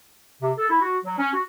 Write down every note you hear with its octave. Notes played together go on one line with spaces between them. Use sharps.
C3
A4
E4
F#4
F#3
C#4
F#4